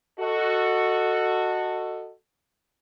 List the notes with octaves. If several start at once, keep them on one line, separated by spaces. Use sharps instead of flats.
F#4 A4 D#5